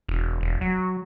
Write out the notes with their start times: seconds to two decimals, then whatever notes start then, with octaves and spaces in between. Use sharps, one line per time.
0.08 E1
0.41 E1
0.61 F#3